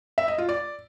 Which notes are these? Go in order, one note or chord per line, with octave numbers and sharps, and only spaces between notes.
E5
D#5
F4
D5